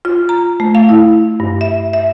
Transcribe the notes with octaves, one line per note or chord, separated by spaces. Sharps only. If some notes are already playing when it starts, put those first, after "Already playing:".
F4
A#5
A3
F5
E4
G2
E5
E5